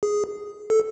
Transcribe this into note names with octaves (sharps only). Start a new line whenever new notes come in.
G#4
A4